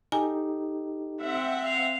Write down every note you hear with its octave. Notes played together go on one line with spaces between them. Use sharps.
D#4 G4 A4 G#5
C4 E5 F#5
F5